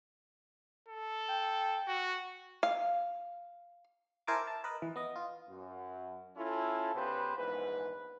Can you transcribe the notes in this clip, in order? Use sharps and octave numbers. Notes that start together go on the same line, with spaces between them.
A4
G5
F#4
F5
E4 A#4 C5 G#5 A5 D6
A5
A#4 B4 D#5 B5
E3
B3 D#5
F4
F#2
C#4 E4 F4 A4
C#3 B3 G4 B4 C5
A#1 E2 G#2 B4